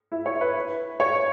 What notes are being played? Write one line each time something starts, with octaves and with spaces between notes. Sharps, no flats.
E4
C#5
B4
C#5